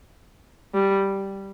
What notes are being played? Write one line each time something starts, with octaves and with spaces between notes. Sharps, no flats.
G3